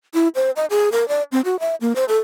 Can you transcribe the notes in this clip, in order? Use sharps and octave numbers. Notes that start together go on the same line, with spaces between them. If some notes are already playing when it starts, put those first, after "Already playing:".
E4
C5
D#5
G#4
A#4
D5
C4
F#4
E5
A#3
C5
A4